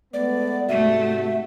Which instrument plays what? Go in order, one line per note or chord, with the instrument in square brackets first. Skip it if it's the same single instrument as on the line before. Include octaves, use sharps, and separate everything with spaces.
[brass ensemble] G#3 A3 B3 [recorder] D5
[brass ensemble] G#2 C3 F#4 [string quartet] A3 [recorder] E5